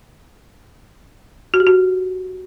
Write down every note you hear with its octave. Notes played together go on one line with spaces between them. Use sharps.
F#4
G4
F#4